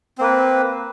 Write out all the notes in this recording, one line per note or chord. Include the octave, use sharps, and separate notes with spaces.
A#3 C4 B4